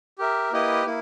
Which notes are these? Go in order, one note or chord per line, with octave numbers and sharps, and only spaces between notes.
G4 A#4 E5
A#3 E4 G4 B4 D#5
A#3 E4